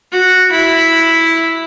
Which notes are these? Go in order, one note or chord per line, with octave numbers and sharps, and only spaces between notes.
F#4
E4